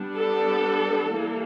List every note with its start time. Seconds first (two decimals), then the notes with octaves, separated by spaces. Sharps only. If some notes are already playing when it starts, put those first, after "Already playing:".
Already playing: G3 B3 D4
0.16 A4
1.14 E3 G3 A#3